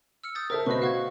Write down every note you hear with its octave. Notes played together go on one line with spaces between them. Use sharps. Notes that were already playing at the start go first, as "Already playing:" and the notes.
E6 F6 C#7
D#6 G6 A6
A4 A#4 C5 E5
B2 B4 C5 D#5 C#6
F#4 F5 C#6 G#6